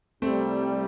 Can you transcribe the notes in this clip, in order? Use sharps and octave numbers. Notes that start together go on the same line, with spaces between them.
C2 C3 G3 A3 C4